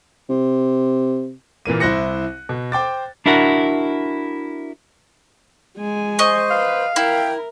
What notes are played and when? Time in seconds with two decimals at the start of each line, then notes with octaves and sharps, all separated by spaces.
0.29 C3
1.66 A#2 E3 A#3 D#7
1.80 C2 E4 C5 F#6 A#6 C#7
2.49 B2
2.72 C5 G5 D6 A6
3.26 D4 E4 F#4 A#4 F#5
5.77 G#3 G#5
6.19 C5 D#5 C#6
6.50 B4 F5
6.96 E4 A#4 G5